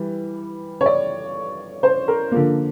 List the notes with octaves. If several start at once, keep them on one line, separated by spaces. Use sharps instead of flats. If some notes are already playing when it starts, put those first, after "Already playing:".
Already playing: E3 G3
C#5
D5
C5
A#4
D3 F3 A#3